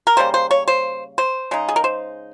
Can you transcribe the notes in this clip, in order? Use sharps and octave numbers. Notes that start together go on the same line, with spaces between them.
A#4
C#3 G3 A#3 C5
C5
C#5
C5
C5
C#3 G#3 D#4
G#4
A#4
C5